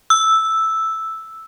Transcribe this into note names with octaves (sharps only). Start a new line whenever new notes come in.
E6